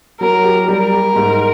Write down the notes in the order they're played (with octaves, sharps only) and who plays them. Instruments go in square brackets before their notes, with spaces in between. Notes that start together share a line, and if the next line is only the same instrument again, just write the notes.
[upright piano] F#3 [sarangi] A#4
[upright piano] G4
[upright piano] G3 [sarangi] A#4
[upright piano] G4
G#2